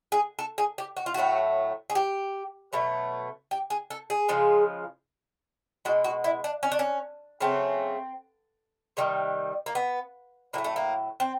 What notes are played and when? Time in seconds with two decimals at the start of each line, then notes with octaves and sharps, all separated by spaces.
0.12 G#4
0.39 A4
0.58 G#4
0.78 G4
0.97 F#4
1.06 F4
1.14 A2 F#3 A3 F#4
1.90 G#4
1.95 G4
2.73 B2 F#3 A3
3.51 G4
3.70 G#4
3.90 A4
4.10 G#4
4.28 C#3 F3 G#3
5.85 B2 G#3 F#4
6.04 F#4
6.24 E4
6.44 D4
6.63 C#4
6.72 D4
6.79 C#4
7.41 C#3 F#3 A3 C4
8.97 C3 D#3 G3
9.66 A#3
9.75 B3
10.53 A2 F#3 A3 A#3
10.64 A3
10.76 A#3
11.20 C4